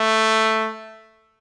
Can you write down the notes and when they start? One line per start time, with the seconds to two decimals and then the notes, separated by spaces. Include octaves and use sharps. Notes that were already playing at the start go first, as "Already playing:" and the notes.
Already playing: A3